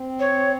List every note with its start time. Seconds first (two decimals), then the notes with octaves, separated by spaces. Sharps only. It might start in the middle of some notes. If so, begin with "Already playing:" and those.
Already playing: C4
0.20 C#5